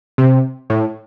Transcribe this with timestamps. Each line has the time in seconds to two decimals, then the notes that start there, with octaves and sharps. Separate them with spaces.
0.18 C3
0.70 A2